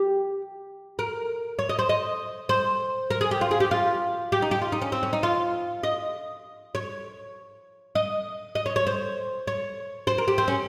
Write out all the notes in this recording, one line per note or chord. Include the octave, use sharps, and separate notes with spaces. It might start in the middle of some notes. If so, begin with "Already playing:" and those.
Already playing: G4
A#4
C#5
D#5
C5
D#5
C5
A#4
G#4
G4
F4
G#4
G4
F4
G4
D#4
G4
F4
D#4
C#4
C4
C#4
D#4
F4
D#5
C#5
D#5
D#5
C#5
C#5
C5
C#5
C5
A#4
G4
C4
C#4